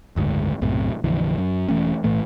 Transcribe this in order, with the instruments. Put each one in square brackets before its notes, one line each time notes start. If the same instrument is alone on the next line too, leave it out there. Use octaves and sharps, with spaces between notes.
[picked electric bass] F#1 D2 G#2
B1 F#2 A2 C3
A#1 F2 D3 E3
F#2
E1 E3 A3 C#4
B1 A2 E3 A3